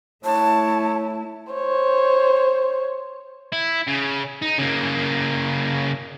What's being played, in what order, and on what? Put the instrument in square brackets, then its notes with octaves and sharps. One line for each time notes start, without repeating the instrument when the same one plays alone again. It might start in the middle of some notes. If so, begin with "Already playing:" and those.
[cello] A3 E4 [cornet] C#5 [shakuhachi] A5
[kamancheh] C5 C#5
[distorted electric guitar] E4
C#3
D#4
C#3 A#3